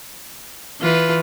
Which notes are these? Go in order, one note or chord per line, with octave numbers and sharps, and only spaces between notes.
E3 F4 B4